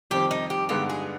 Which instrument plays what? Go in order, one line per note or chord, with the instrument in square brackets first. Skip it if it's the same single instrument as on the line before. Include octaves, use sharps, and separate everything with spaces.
[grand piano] F2 D#3 G3 C4 [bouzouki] G4
[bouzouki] D#4
G4
[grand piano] G2 D3 G#3 B3 D#4 [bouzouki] G4
[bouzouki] G#4